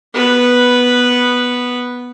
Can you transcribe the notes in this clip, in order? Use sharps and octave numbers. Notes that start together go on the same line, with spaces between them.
B3 B4